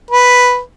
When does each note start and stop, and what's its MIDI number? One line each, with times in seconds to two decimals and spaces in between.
0.11 0.59 71